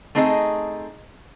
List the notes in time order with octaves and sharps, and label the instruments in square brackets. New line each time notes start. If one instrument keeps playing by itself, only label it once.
[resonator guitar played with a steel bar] A3 C4 D#4 G#4 A#4 D#5